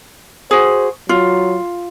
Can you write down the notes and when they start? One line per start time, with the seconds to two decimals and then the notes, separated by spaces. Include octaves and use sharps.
0.51 F#4 G#4 C5
1.09 F#3 F4